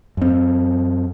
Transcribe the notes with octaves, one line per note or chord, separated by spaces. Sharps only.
F#2 C4